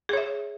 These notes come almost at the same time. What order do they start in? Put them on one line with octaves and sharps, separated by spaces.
G#4 C#5 E5